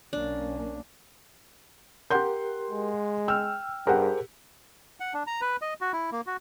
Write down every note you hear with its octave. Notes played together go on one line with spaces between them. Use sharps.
B1 A#3 C#4 D4
G4 A#4 F#5 C6 G6
G#3
G5 E6 F6
G2 G4 G#4 A#4 C5 F#5
F#5
D4
A#5
B4
D#5
F#4
E4
A#3
F#4